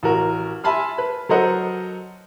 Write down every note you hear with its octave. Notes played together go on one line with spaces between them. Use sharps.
A1 F#4 A#4
E5 G#5 A5 B5 C6 F6
B4
F#3 A4 A#4 C5 D#5 F#5